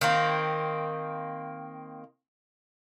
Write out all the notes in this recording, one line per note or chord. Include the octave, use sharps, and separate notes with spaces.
D#3 A#3 C4